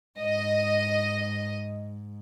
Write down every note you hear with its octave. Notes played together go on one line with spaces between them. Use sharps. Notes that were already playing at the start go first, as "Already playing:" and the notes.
G#2 D#5